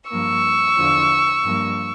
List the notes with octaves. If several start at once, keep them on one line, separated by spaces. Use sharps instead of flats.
G2 F3 A#3 C#6 E6
E2 D3 F3
G2 F3 A#3